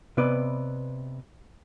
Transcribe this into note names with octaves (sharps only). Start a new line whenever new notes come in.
C3 B3 B4 D5 D#5